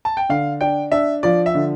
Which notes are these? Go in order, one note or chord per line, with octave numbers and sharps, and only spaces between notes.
A5
G5
D3 F5
D4 G5
D4 E5
F3 D5
E5
D3